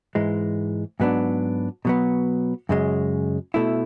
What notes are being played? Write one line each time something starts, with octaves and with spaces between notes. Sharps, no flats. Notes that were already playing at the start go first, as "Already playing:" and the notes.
G#2 E3 G#3
G#2 F#3 B3 D4
B2 F#3 B3
F#2 C#3 G#3
B2 A3 E4